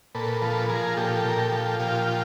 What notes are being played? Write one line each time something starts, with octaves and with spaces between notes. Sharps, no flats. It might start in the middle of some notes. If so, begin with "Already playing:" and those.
A#2 A4 B4
F3 A4 B4
F3 G#4 A#4
A#2 G4 A4
A#2 A#4
G4 A4
F3
A#2 F4 G4
F3